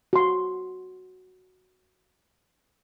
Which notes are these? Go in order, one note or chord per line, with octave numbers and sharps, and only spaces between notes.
F#4 C6